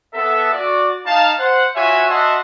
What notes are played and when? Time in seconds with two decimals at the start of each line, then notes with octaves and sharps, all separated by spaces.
0.14 B3 A4 E5
0.53 F#4 D5
1.06 D#4 F5 A5
1.39 C5 F#5
1.76 F4 F#4 C#5 E5 G#5
2.09 F#4 D#5 E5 F#5 A5 C6